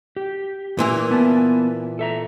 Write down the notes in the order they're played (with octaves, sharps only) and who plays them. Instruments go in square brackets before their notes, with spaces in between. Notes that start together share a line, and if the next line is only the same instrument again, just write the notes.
[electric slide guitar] G4
[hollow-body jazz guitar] A#2 E3 A#3
[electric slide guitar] B3 G#5 A5
A4 E5 A#5